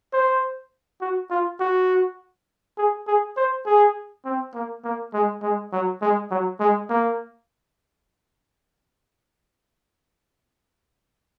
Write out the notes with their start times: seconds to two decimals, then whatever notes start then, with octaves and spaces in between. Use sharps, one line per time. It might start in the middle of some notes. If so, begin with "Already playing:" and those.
0.13 C5
1.01 F#4
1.30 F4
1.60 F#4
2.78 G#4
3.07 G#4
3.36 C5
3.66 G#4
4.25 C4
4.54 A#3
4.84 A#3
5.13 G#3
5.42 G#3
5.72 F#3
6.01 G#3
6.31 F#3
6.60 G#3
6.90 A#3